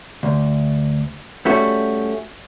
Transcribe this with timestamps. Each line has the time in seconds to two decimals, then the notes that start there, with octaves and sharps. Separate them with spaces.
0.23 D2
1.45 G3 A3 C#4 F#4